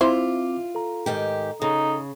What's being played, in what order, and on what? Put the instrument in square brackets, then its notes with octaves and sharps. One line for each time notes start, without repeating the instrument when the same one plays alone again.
[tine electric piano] C4 D6 [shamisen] E4 C5 [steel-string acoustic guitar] F4
[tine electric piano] A4 A#5
[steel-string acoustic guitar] G#2 D#3 G4
[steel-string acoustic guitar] C#3 [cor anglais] D#4 [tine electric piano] A4